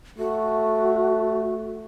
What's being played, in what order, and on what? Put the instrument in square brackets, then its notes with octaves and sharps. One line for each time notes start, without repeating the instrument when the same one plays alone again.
[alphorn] A3 [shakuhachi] F#4